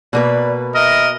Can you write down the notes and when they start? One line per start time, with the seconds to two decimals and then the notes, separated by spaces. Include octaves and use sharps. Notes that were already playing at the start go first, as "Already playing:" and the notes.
0.13 B2 A#3 B4 D5
0.75 A#4 D#5 E5